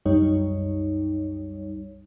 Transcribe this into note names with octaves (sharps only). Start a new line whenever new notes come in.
C2 F#2 G3 D#4 C#5